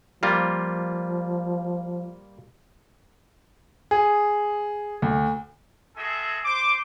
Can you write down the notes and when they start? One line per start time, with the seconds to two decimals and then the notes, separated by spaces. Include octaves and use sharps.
0.23 F3 G3 A#3 F4
3.91 G#4
5.02 D2
5.96 F4 F#4 G#4 A4 E5 G#5
6.45 C5 D6